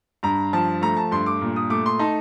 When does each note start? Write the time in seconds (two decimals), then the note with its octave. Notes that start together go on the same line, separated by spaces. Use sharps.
0.23 G2 A#5
0.53 F3 A5
0.82 A3 A#5
0.97 A5
1.11 G2 C6
1.26 D6
1.41 A#2
1.56 D#6
1.70 A3 D6
1.86 C6
1.99 D#4 A5